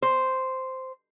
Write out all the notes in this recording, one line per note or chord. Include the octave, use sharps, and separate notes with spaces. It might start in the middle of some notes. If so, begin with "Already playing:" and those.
C5